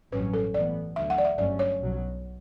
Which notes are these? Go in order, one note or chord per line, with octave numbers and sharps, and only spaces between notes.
A1 G2 F#3 C#4 B4
A4
A1 A2 E3 B3 D5
D2 D3 F#3 E5
F#5
D5
E5
G1 G2 F#3 A3 C#4 D5
C#5
B1 B2 F#3